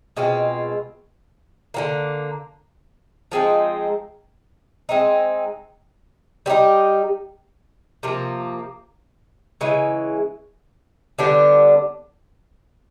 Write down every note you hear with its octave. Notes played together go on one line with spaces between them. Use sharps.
B2 G#3 C4 F4
D3 F#3 A#3
F3 G#3 C4 D#4
G#3 C4 D#4
G3 C4 D#4 G4
C3 F3 A#3
C#3 E3 G#3
D3 G3 B3 D4